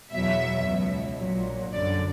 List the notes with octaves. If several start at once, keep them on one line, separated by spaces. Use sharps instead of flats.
E2 B2 F#3 E5
C#2 B2 F#3
A#1 A#2 F#3
F#2 D3 F#3 D5